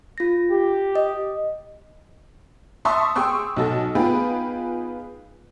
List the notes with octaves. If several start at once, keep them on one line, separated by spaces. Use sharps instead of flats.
F4 A#6
G4
D#5
E5 A5 C6 C#6 D#6 E6
G#4 G5 C6 C#6 E6
B1 F#4 A4
B3 D#4 F4 G#4 B4 G5